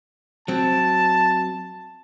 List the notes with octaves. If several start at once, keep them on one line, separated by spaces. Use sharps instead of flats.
F#3 C4 A5